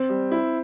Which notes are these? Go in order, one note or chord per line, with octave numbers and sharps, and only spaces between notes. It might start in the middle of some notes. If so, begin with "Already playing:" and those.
Already playing: C4
G3
E4